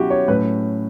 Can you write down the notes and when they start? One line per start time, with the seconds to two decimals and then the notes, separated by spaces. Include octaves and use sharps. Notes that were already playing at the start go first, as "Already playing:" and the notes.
Already playing: B2 F#3 C#4 E4 F#4 G4
0.10 C#5
0.28 A2 F#3 C#4 B4